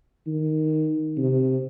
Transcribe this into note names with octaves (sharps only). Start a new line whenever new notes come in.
D#3
C3